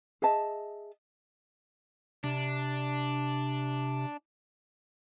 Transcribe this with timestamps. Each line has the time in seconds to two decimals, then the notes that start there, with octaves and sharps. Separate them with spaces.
0.22 G#4 D#5 E5 A5
2.24 C3 D4